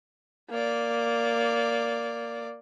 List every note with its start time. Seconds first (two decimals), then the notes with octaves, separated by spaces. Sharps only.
0.50 A#3 D5